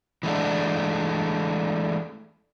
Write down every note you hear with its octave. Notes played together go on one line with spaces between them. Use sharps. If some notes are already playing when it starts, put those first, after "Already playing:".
E3 G#3 A3 D4